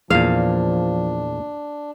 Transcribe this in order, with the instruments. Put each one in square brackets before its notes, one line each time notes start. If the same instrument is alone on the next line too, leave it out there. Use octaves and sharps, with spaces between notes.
[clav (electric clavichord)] E2 A#2 [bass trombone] F3 [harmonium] D4 [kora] F5